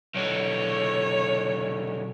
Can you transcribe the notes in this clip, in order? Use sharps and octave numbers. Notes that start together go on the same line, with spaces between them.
B1 D3 C#5